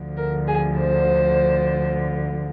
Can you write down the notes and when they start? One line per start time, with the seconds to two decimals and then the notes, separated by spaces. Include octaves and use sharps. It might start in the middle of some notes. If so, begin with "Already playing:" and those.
Already playing: D2 D3 F3
0.16 A#4
0.47 G#4
0.78 C5